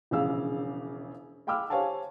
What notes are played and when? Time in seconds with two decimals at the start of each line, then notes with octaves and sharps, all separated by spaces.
0.11 E1 A#1 C#3 F5 E6
1.47 F5 G5 B5 D6 E6 F6
1.70 G4 C5 C#5 F5 G#5 A5